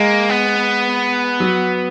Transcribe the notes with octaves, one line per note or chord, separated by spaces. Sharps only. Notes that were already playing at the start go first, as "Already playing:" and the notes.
Already playing: G#3 A#3
B3
F#3